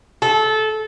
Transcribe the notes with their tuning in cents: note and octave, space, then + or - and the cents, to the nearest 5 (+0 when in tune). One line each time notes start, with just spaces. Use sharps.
A4 -20